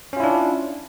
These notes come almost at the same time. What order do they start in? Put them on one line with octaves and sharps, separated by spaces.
C#4 F4 E4 D4